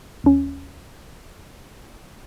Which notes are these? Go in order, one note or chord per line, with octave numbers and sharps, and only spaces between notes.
D#2 C#4